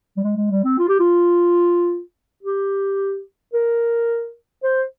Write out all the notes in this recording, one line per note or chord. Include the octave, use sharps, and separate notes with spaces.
G3
G#3
G#3
G3
C4
F4
G4
F4
G4
A#4
C5